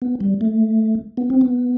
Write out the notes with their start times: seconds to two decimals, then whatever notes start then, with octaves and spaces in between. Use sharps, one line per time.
0.02 B3
0.21 G3
0.41 A3
1.17 B3
1.30 C4
1.41 B3